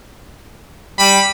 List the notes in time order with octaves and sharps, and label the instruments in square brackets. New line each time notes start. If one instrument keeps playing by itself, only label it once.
[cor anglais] G3 [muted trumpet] B5